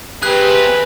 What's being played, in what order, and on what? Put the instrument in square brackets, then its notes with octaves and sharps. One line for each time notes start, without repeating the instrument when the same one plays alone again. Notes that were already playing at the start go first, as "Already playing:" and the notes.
[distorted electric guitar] C4 G#4 [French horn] G4 [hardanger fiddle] B4 [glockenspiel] F#6